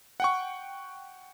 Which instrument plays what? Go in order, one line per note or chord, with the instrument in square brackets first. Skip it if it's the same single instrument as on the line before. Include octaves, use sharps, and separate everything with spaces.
[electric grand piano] F#5 G5 C#6